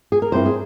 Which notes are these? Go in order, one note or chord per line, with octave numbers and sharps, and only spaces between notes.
G#4
A#4
G2 G3 C4 E4 C5
G#4